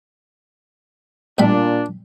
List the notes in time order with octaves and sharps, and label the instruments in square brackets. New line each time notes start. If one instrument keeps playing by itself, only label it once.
[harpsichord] A1 G3 B5 [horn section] A#2 D4